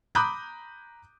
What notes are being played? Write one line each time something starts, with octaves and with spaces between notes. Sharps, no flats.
A#5 B5 D6 D#6 F#6 G6